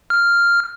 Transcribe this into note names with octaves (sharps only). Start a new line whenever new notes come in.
F6